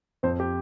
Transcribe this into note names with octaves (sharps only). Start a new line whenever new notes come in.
F2 C4 C5
G4